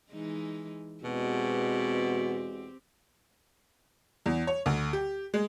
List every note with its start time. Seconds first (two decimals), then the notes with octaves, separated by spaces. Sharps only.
0.11 E3 G#3 D#4
1.04 E2 B2 G#3 C4 F#4 G4
4.26 E2
4.47 C#5
4.66 D2
4.93 G4
5.34 G#3